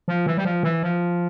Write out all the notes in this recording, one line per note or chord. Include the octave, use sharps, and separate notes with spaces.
F3
E3
G3
F3
E3
F3